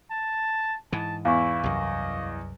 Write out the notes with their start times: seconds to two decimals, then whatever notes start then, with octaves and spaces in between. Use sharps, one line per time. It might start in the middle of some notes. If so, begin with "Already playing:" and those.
0.10 A5
0.92 G#2 E3 A5
1.25 E2 E4 F5 C#6
1.63 C2 F#2 D#5